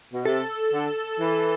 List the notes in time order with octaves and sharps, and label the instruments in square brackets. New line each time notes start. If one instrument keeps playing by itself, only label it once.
[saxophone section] B2
[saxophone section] C3 [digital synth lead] A4
[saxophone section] D3
E3